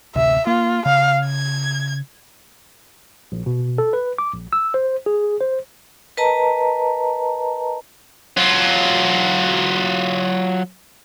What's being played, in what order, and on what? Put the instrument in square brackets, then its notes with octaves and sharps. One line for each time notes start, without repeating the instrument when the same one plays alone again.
[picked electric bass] A1 D2 C3 [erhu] E5
[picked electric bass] A#3 [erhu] F4
[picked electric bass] C#3 [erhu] F5
[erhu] G#6
[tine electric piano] A#1
B2
A4
B4
D6
A#1
E6
C5
G#4
C5
[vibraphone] A#4 B4 D#5 A5 A#5
[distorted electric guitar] F#3 F4